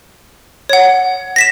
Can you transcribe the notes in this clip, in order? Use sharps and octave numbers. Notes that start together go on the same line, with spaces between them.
C#5 F#5
A#6 B6 E7